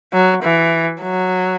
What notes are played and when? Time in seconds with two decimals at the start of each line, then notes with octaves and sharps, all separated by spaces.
0.13 F#3
0.43 E3
1.02 F#3